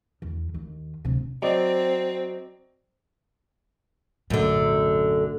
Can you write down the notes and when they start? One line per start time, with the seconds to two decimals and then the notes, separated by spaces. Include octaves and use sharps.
0.22 E2
0.54 D#2
1.05 D1 C3
1.42 F#3 C4 D5 D#5
4.30 B1 F#2 A2 D3